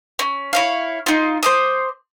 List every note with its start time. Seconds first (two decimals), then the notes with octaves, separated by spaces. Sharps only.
0.19 C#4
0.53 E4 C#5 F5
1.06 D#4 F4
1.43 C5 D6 D#6